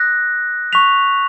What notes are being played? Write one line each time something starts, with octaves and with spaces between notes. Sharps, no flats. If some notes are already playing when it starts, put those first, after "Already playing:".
Already playing: D#6 F#6 A#6
C#6 F#6 B6 F7